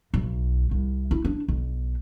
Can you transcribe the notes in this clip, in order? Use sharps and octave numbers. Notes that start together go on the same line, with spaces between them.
B1
C2
E4
D4
B1